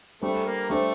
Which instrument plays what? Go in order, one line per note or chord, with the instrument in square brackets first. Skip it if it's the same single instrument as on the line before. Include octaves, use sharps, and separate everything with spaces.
[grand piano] G3 D4 A4 C5 [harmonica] A3
[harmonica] A#3
[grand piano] G3 D4 A4 C5 [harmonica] A3